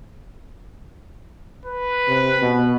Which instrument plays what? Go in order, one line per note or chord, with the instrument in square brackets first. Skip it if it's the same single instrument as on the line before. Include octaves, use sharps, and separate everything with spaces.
[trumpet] B4
[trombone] C3
B2